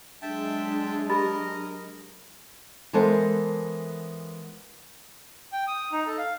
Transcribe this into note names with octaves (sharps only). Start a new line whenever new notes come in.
F#3 G#3 D4 E5 G5 A5
G4 A#4 D#5 B5 A6
E3 G#3 B3 A4 A#4 C5
G5
D#6
D#4
A4
F5